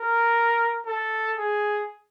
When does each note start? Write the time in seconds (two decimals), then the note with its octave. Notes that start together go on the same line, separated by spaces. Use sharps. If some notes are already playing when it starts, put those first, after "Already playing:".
Already playing: A#4
0.87 A4
1.37 G#4